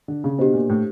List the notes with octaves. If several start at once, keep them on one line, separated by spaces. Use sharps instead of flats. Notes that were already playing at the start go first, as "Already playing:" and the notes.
D3
C#3
B2 D4 G4 C5
A#2
A2